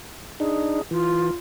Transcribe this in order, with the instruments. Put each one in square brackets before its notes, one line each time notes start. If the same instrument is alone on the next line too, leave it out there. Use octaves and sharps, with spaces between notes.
[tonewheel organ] D4 D#4 [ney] G#4
[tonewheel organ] E3 [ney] F4